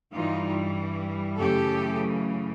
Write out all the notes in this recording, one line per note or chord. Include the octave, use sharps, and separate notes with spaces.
G2 E3 G3 D#4 F4
F#2 C#3 E3 A3 G4 A4